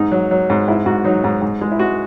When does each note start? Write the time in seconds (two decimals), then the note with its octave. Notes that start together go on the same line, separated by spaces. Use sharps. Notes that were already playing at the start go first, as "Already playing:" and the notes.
Already playing: G#2 D#4
0.12 F#3
0.31 F#3
0.50 G#2
0.68 G#2 E4
0.86 G#2 F#4
1.04 F#3 D#4
1.24 G#2
1.42 G#2
1.61 G#3
1.72 E4
1.79 G#3 F#4